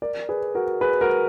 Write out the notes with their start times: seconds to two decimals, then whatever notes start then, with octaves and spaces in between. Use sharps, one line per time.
0.02 A#4 D5
0.29 G#4 B4
0.55 F#4 A#4
0.81 G#4 B4
1.01 F#4 A#4